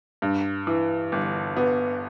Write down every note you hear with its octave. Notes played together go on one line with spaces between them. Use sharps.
G2
E3
G1
B3